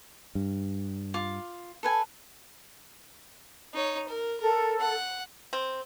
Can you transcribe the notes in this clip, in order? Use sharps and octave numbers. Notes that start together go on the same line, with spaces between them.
G2
F4 D6
A4 B4 G#5
D#4 C#5
A#4
A4 A#4
F#5
C4